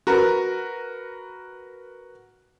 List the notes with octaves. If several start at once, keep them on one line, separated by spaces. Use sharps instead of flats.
F#4 A#4 B4